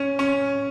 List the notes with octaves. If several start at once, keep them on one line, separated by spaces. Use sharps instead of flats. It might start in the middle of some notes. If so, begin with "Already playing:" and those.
Already playing: C#4
C#4